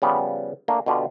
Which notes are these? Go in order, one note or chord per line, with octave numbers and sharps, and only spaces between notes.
C#3 F3 G3 B3
A3 A#3 D4
B2 D3 F4 G4